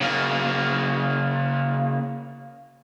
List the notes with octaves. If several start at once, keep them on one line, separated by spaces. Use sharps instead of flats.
C#3 A#3